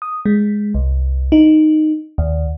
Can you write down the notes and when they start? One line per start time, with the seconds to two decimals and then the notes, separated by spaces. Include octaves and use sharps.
0.02 D#6
0.26 G#3
0.75 C2
1.32 D#4
2.18 D#2